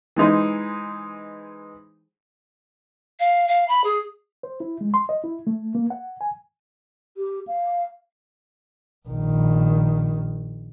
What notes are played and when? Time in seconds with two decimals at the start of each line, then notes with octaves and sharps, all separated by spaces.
0.16 E3 G#3 D#4 C5
3.20 F5
3.48 F5
3.68 B5
3.84 G#4
4.43 C5
4.60 E4
4.81 G#3
4.94 C6
5.09 D#5
5.24 E4
5.47 A3
5.75 A#3
5.90 F#5
6.21 G#5
7.17 G4
7.47 F5
9.08 A#1 D#3